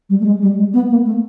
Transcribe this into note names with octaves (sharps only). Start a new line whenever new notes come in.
G3
A3
G#3
G3
G#3
B3
A#3
A3